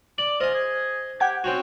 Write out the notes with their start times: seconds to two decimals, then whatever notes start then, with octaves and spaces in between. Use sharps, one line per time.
0.18 D5 D6 F#7
0.41 F4 C5 D#5 G#5
0.54 G#4
1.20 G4 F#5 G5 G#6
1.44 C4 C#4 F#4 C5